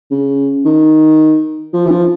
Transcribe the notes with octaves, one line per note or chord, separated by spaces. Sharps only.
C#3
D#3
F3
E3
F3